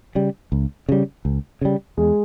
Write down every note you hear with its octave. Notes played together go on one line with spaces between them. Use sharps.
C#3 G3
C#2
C#3 G3
C#2
C#3 G3
E2 G#3